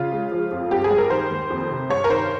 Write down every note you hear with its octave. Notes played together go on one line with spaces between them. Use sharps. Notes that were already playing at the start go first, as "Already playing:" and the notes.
Already playing: C#3 F4
G#3
F3
F2
G2 G4
G#4
G3
A#4
D#3 C5
D#2
F2
C3
G2 C#5
A#4
D#3 C5